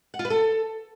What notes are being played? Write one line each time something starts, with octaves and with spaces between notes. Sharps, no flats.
F#5
F4
B4
A4